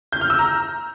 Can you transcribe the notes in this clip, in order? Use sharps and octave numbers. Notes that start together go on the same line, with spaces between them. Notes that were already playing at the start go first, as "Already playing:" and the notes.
G6
F6
E6
A#5